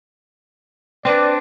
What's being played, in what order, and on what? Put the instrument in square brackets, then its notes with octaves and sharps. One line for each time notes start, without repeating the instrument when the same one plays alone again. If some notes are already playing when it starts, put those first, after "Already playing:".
[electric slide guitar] C4 D4 [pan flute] B4 [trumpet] D5